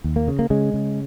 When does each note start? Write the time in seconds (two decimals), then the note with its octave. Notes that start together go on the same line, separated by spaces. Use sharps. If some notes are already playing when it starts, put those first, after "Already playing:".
0.04 D#2
0.16 A#3
0.28 C#3
0.39 A#3
0.50 C#3 G#3
0.74 C#3